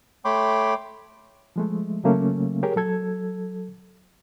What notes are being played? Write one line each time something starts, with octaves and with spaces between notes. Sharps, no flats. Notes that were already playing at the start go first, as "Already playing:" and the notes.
A3 C#5 G5 B5 C6 D6
F3 G#3 A3
C#3 F#3 A3 A#3 C#4
G4 G#4 A#4 C#5
F#3 A4 G#6